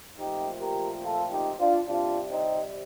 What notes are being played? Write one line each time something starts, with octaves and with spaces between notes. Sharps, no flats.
A#2 F3 A3 C4 D#4 G4
G4 A#4
F4 A4
D#4 G4
D4 F4
C3 G3 C4 D4 F4
C4 D#4